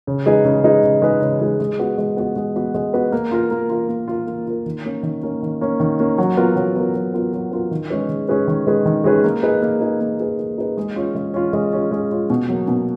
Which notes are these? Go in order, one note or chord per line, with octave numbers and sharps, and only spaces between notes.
C#3
G#3 D#4 G#4 B4
C#3
G#3 D#4 G#4 B4
C#3
G#3 D#4 G#4 B4
C#3
G#3 D#4 G#4 B4
G#3
B3 F#4 B4
G#3
B3 F#4 B4
G#3
B3 F#4 B4
G#3
B3 F#4 B4
A#3
F4 A#4
A#3
F4 A#4
A#3
F4 A#4
A#3
F4 A#4
D#3
A#3 C#4
D#3
A#3 C#4
D#3
A#3 C#4
D#3
A#3 C#4
F#3
B3 F4 A#4
F#3
B3 F4 A#4
F#3
B3 F4 A#4
F#3
B3 F4 A#4
D#3
G#3 C#4 G#4 B4
D#3
G#3 C#4 G#4 B4
D#3
G#3 C#4 G#4 B4
D#3
G#3 C#4 G#4 B4
A#3
D#4 G#4 B4
A#3
D#4 G#4 B4
A#3
D#4 G#4 B4
A#3
D#4 G#4 B4
G#3
C#4 F4
G#3
C#4 F4
G#3
C#4 F4
G#3
C#4 F4
B2
F#3 A#3
B2